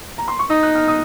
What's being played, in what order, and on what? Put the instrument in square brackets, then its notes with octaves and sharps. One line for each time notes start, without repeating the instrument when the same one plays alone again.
[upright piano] A#5
C6
C#6
[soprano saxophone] D#4 [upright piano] D#6
[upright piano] F#6
F6
D#6